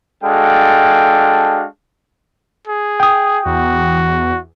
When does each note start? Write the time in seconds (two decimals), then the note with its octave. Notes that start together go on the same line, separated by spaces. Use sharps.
0.24 G#3 D4 F#4 A4 F5 G5
2.67 G#4
3.00 G5 D#6
3.46 E2 F#4